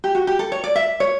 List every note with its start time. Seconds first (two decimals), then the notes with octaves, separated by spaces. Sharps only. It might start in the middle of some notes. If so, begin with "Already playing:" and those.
0.04 G4
0.15 F#4
0.27 G4
0.39 A4
0.52 C#5
0.64 D5
0.76 E5
1.00 C#5